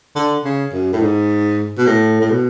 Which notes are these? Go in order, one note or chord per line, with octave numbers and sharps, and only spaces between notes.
D3
C#3
F#2
A2
G#2
B2
A2
A2
B2